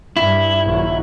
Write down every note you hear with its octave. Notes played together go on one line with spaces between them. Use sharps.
G2 E4
A#1 D#3 F#3